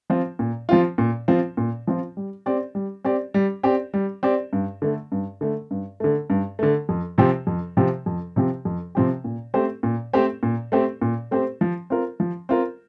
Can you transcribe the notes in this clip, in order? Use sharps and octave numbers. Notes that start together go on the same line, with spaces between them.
F3 C4 F4
A#2
F3 C4 F4
A#2
F3 C4 F4
A#2
F3 C4 F4
G3
C4 G4 D5
G3
C4 G4 D5
G3
C4 G4 D5
G3
C4 G4 D5
G2
D3 A3
G2
D3 A3
G2
D3 A3
G2
D3 A3
F2
C3 F3 C4 G4
F2
C3 F3 C4 G4
F2
C3 F3 C4 G4
F2
C3 F3 C4 G4
A#2
A3 C4 G4 C5
A#2
A3 C4 G4 C5
A#2
A3 C4 G4 C5
A#2
A3 C4 G4 C5
F3
C4 F4 A#4
F3
C4 F4 A#4